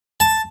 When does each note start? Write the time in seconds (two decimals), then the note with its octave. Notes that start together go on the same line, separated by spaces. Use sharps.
0.20 A5